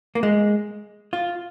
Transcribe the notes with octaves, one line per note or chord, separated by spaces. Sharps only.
A#3
G#3
F4